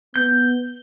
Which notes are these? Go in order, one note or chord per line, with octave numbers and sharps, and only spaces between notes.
B3 G6